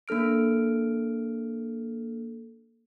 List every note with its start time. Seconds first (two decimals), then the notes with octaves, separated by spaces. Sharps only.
0.08 A#3 D4 A4 F6 D7